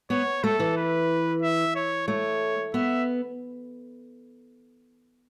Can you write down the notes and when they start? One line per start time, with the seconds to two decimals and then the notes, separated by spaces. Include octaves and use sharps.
0.10 B3 C#5
0.44 A3 A4
0.60 E3
0.77 B4
1.42 E5
1.76 C#5
2.08 A3 C#5
2.74 B3 E5